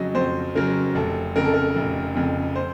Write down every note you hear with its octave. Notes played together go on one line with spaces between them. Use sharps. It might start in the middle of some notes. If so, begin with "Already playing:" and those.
Already playing: F2 C#3 F#3 D#5
F2 C5
C#3 F#3 A#4
F1 A4
F2 C#3 A#4
A4
A#4
F1
F2 C#3
C5